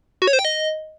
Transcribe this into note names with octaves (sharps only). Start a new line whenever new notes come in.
F#4
C#5
C5
G5
D#5